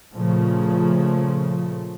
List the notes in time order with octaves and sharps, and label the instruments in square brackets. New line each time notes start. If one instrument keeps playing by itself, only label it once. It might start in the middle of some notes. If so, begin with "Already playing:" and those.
[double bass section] A#2 C#3 F3 A3